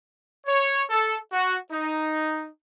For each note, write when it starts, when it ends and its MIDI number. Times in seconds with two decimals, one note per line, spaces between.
0.46 0.83 73
0.90 1.16 69
1.32 1.55 66
1.71 2.46 63